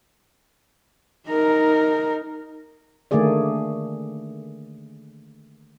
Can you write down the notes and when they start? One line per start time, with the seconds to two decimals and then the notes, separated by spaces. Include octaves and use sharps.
1.28 D#4 A#4
3.11 D3 D#3 A3 A#3 G#4 D5